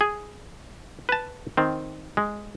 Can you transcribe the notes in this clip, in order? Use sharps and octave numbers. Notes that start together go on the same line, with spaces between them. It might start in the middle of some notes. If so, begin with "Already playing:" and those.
G#4
B4 A5
D#3 C4
G#3